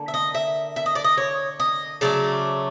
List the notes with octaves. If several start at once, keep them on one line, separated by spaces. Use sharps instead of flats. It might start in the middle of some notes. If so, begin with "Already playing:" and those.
Already playing: D3 A#3
E5
D#5
E5
E5
D#5
D5
D#5
C#5
D#5
C#3 F#3 A3 D5